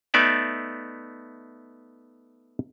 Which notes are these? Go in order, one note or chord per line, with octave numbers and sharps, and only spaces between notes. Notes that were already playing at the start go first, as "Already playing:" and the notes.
A3 B3 D#4 D5 E5